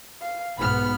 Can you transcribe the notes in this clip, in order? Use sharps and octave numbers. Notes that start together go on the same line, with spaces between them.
F5
B1 G#2 B3 B5 F6